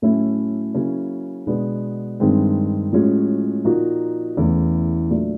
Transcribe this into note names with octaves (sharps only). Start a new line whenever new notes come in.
A2 F#3 A3 C#4 E4
C#3 F#3 A#3 C#4 E4
B2 G#3 B3 D4
G2 D#3 G#3 C4
A2 F3 G#3 C#4 F#4
A#2 F3 A#3 D#4 F#4
E2 C#3 E3 A3
A#2 F#3 A3 D4